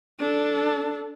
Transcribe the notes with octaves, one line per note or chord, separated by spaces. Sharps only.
D4 A4